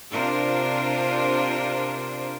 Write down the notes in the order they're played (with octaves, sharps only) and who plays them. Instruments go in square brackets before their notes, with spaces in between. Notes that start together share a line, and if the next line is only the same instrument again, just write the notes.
[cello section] C3 D4 F4 A#4 C5